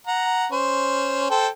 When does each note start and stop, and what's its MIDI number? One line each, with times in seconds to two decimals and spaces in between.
0.07 0.46 78
0.07 0.46 82
0.52 1.28 61
0.52 1.28 72
1.30 1.48 69
1.30 1.48 72
1.30 1.48 79